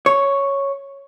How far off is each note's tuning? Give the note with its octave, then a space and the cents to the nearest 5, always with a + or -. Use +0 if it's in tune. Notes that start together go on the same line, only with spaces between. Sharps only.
C#5 +0